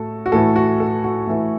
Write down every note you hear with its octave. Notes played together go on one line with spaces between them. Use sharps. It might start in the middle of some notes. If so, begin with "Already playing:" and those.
Already playing: A2 A3 F#4 A4
F#4
A2 E3 A3 A4
F#4
A4
F#4
A2 E3 A3